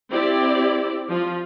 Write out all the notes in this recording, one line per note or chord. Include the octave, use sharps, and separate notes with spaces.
C4 E4 G4 D5
F3 F4